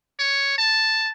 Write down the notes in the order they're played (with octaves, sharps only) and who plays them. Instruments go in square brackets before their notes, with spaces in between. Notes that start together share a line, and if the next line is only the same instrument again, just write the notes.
[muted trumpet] C#5
A5